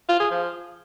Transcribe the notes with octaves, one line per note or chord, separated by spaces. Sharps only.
F4
G#4
F3